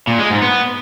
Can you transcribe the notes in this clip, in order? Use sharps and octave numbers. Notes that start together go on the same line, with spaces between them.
A#2
G#3
G#2
B3